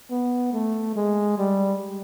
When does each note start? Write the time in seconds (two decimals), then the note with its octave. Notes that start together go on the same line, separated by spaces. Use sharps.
0.11 B3
0.53 A3
0.96 G#3
1.38 G3